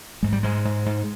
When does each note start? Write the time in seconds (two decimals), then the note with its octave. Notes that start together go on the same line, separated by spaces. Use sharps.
0.23 G#2 G#3
0.33 G3
0.43 G#2 G#3
0.65 G#2
0.86 G#2